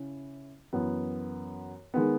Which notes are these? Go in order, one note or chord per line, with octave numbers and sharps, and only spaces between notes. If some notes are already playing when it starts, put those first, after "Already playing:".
Already playing: C#3 C#4 E4
F#2 E3 B3
D#3 G#3 B3